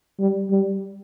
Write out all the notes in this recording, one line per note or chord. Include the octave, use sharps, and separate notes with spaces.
G3
G3